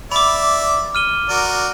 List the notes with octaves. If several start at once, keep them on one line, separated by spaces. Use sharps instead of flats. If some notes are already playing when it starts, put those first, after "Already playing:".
D5 E5 B5 D6
F6 D#7 G7
F#4 A#4 D5